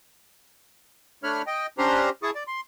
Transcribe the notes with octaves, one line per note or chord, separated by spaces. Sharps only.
A3 D4 C#5 B5 F6
D#5 G5
C#4 D4 G4 C5 A#5 C6
E4 G#4 A5 C#6 D#6
D5
C6